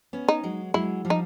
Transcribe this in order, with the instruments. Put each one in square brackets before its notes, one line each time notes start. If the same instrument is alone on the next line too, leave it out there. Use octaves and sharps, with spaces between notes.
[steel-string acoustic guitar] B3 C#4
[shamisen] D#4
[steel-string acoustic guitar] F#3 G#3
[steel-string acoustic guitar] F#3 G#3 [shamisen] E4
[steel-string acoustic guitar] F3 G3
[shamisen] D#4